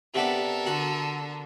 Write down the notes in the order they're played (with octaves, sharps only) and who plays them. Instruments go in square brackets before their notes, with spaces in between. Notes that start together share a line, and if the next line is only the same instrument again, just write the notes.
[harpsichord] C3 B3 D4 [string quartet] A4 A#4
[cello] D3 [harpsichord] F#4